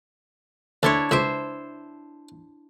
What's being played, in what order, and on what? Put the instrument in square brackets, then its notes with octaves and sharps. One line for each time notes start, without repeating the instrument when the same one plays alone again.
[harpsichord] D2 C6 [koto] D4 E4 C#5
[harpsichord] C#2 D6 [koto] C5 E5